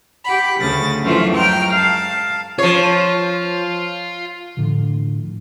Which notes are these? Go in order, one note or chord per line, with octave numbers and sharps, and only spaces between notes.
G4 F#5 B5
D2 C#3 A6 A#6
F#2 E3 F3 A3 C#4 F4
F#2 F#3 G#3 G5 A#5 F6
F5 A5
F3 F4 C#5
A2 D3 E3 F3